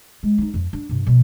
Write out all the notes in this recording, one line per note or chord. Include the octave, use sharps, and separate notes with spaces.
G#3
D#4 F4
F2
D4
G2 C3
B2 F3